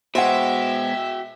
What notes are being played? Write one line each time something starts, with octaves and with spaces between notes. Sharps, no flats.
B2 G#3 F#4 C5 E5 F#5 G5